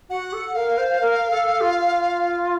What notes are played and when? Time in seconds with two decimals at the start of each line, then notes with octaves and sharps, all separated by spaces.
0.10 F#4 F#5
0.32 A4
0.55 A#4 F5
0.78 C5
1.00 A#4
1.31 A4
1.61 F4